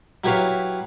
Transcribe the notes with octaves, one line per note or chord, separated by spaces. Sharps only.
F#3 E4 G4 B4 C#5 F5